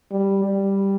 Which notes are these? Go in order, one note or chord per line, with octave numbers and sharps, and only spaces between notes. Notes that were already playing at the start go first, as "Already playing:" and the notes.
G3
G3